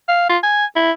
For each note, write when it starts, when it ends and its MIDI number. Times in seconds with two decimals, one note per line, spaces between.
0.09 0.25 77
0.29 0.38 65
0.43 0.65 80
0.76 0.92 64